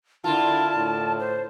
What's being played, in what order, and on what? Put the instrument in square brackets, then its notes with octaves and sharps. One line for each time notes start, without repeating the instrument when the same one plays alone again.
[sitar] D3 A#3 F4 [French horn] E4 [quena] A5
[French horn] A2
[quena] C5